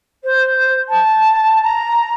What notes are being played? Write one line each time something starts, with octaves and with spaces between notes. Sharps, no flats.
C5
A5
A#5